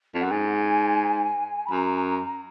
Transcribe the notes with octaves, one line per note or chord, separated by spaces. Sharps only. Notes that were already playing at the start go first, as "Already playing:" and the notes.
F2
F#2 F#5
G#2 G#5
B5
F#2 A#5